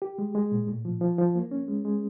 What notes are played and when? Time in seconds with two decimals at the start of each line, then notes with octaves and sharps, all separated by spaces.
0.02 G4
0.18 G#3
0.35 G#3
0.52 A#2
0.68 A2
0.85 F3
1.01 F3
1.18 F3
1.35 A#3
1.51 C#4
1.68 G#3
1.85 G#3